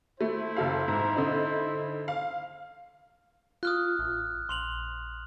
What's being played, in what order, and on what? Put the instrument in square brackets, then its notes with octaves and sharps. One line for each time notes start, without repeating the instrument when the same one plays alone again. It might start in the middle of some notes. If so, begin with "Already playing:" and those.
[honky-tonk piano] A3 [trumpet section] E4 C5
[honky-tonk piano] F#1 A4 F5
G#2
D3 D#4
F5
[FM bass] F4 [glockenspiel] D#6 F6 F#6
[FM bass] A1
[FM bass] A#1 [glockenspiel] C6 F7 F#7